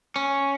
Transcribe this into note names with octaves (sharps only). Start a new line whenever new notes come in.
C#4